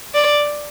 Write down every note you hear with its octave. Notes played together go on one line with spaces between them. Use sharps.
D5